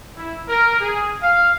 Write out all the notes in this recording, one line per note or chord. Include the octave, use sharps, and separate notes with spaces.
E4
A#4
G#4
F5